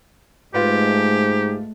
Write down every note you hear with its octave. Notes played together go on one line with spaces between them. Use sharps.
G#2 G#3 A3 F4 G4 B4